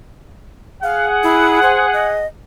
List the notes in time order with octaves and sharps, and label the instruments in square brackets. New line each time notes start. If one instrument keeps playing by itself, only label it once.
[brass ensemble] G#4 F#5 [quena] F5
[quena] E4
C5
D#5